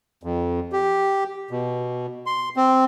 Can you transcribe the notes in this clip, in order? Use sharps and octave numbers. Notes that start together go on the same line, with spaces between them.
F2
G4
B2
C6
C4